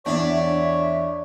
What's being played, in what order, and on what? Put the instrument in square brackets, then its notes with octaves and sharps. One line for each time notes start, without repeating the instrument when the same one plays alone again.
[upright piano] E2 [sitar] D4 [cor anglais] C#5 [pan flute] E5